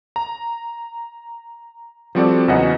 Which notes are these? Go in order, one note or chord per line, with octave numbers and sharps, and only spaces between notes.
A#5
F3 G3 C4 F#4 A4 D5
E2 C#3 F#3 C#4 D#5 F#5